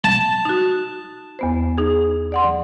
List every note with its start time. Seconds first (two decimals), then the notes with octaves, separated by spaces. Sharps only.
0.04 A5
0.45 D#4 F#4
1.39 E2 B3 C5
1.78 D#4 G#4
2.32 D5 F#5 C6